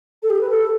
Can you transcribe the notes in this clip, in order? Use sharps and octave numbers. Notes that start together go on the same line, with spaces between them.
A4
G4
B4
A4